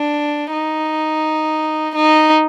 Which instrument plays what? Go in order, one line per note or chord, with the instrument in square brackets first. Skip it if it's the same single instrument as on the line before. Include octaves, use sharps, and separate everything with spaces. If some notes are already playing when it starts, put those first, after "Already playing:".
Already playing: [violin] D4
D#4
D#4